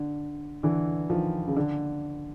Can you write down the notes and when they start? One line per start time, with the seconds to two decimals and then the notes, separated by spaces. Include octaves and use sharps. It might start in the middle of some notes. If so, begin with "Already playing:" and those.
Already playing: D3
0.63 D3 E3
1.10 D#3 F3
1.48 C#3
1.57 D3